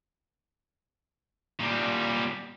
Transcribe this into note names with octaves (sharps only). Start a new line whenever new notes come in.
A#2 G3